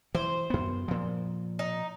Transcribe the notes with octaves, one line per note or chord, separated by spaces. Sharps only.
E3 C5
F#2 B3
A#2 F3
D#4